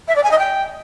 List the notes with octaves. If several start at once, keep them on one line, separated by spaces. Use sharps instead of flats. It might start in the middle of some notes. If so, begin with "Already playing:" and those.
E5
D5
G#5
D#5
G5